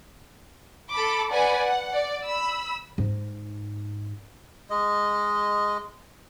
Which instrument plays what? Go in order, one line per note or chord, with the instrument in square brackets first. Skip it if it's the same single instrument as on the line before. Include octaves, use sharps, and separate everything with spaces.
[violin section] A4 B5 D6
B4 D5 F#5 G#5
F#5
D5
B5 E6
[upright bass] G#2 D#4
[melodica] G#3 D#5